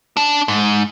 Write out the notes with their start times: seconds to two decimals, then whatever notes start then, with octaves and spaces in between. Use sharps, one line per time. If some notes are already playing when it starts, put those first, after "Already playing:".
0.17 D4 A5
0.48 G#2